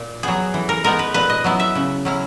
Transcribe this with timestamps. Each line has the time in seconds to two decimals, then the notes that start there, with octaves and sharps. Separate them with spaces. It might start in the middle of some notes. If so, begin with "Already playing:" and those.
Already playing: A#2
0.23 F#3 B3 G#4
0.54 E3
0.69 A#4
0.84 G#3 B3 D#4 A#4
0.99 B4
1.14 A#2 B4
1.30 D#5
1.44 F#3 B3 E4
1.60 E5
1.75 C#3
2.05 F#3 C#4 E4